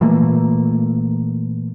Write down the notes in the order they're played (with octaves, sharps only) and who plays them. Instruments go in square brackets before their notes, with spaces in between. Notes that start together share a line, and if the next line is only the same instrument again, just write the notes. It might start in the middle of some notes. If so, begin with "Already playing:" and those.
[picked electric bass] A#2 E3 A3 A#3